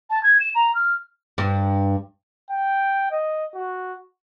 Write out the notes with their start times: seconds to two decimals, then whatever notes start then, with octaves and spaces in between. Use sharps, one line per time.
0.10 A5
0.23 G#6
0.40 E7
0.55 A#5
0.75 F6
1.38 G2
2.50 G5
3.11 D#5
3.54 F#4